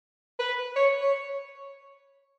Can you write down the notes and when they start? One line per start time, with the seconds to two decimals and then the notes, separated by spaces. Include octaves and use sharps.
0.39 B4
0.76 C#5
1.01 C#5